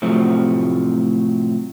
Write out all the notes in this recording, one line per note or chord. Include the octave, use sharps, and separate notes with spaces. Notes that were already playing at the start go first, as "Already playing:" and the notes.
A2 C3 F3 F#3 A3